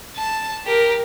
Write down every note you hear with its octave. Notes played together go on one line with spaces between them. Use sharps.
A5
G4 A#4